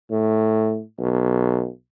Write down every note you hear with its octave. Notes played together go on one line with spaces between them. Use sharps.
A2
B1